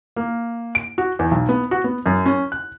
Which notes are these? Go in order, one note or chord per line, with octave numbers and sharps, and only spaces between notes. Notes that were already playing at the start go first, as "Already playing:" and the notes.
A#3
D7
F#4
E2
B1
B3
F#4
B3
F#2
C#4
F#6